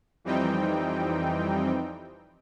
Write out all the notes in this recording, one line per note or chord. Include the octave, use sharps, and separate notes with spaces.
F2 E3 G3 C4 D#4 G5